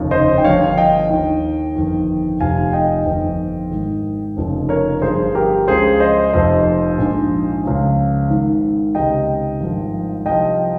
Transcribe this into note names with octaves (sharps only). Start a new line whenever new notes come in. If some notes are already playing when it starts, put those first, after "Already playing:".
Already playing: F1 D#2 C#3 F3
C5 D#5
G5
G1 G2 F3 C#5 F5
D#5 G5
D#2 D#3
G1 F2 D#3
F1 F2 C3 F3 F5 G#5
D#5 G5
G1 F2 D#3
G#1 G#2 D#3
F1 F2 C#3 F3
A#4 C#5
G1 G2 F3 G#4 C5
G4 A#4
C#2 C#3 F3 G#4 C5
C5 D#5
F1 F2 C3 F3 C5 D#5
A#1 G#2 F3
C#2 C#3 F3
G#1 G#2 D#3
C#2 C3 D#3 D#5 G5
G#1 G2 F3
C2 C3 F3 D#5 G5